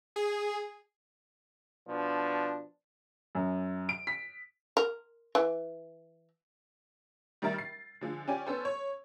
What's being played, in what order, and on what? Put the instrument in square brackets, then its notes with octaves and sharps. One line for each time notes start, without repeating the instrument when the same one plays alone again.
[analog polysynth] G#4
[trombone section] B2 F3 D4
[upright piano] F#2
D7
B6
[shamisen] A#4
E3
[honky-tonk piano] D#3 G3 D#4 A#4 E5 A6
C7
D3 F3 G#3
C#4 G4 D5 G#5
B3 C#4 A4 C5
C#5